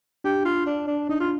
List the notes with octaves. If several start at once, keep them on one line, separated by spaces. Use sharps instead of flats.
D4 G4
F4
D4
D4
D4 D#4
F4